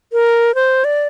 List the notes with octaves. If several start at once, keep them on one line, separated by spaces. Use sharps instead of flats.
A#4
C5
D5